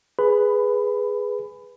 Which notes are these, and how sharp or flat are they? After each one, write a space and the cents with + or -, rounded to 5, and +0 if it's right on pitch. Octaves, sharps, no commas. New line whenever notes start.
G#4 +0 B4 +0 B5 +20